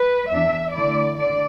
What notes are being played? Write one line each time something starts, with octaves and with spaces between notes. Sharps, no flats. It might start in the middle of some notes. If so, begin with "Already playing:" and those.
Already playing: B4
E2 E3 D4 E5
D3 A3 E4 D5
D3 D5